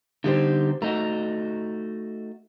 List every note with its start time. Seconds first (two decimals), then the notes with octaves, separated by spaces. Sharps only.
0.24 D3 G3 D#4 G4 C5
0.82 A3 D#4 F#4 A#5